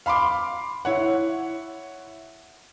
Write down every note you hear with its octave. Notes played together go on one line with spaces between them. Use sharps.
F5 B5 C6 D6
E4 C#5 F#5